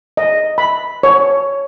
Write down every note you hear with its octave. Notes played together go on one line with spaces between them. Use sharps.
D#5
B5
C#5